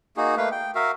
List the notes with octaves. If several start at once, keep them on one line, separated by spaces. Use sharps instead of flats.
A#3 D#4 F#4 G#4
A3 A#3 B4 F5
G5
F#4 A#4 E5 F5